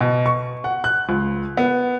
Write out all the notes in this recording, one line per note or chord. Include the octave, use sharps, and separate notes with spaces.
B2
C#6
F#5
F#6
C#2
B3